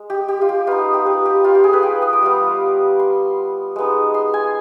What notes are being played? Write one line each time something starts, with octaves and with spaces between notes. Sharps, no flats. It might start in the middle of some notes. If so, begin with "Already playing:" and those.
Already playing: G#3
G4
G4
F4
G4
B3 D#4 F4
G4
B4
G4
F4
G4
G#4
B4
G5
D#6
D6
G3 B3 F4
C6
G#3 B3 D#4
C6
G#5